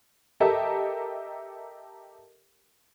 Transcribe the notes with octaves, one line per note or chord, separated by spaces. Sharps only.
G4 A4 A#4 D#5 E5